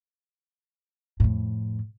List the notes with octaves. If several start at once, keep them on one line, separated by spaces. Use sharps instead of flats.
F2 A2